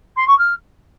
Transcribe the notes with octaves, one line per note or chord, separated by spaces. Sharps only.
C6
C#6
F6